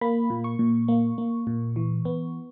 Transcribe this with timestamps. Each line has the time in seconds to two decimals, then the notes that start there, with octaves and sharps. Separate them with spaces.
0.01 A#3 B5
0.30 A#2
0.44 C#6
0.59 A#2
0.88 A#3
1.18 A#3
1.47 A#2
1.76 E3
2.05 B3